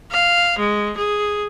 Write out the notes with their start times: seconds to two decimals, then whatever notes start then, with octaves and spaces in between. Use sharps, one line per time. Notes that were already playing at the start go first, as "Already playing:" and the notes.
0.11 F5
0.58 G#3
0.97 G#4